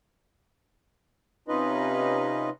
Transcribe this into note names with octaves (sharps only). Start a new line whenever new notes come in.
C3 C#4 D#4 F4 B4 D#5